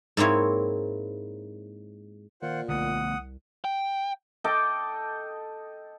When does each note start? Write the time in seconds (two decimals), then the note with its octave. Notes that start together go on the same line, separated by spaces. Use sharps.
0.17 G#2 A#3 C4 E4 C#5
2.42 A#2 D#3 F4 C5 F#5
2.69 C2 D3 A3 B3 F#5 D#6
3.64 G5
4.44 A4 D#5 G5 D6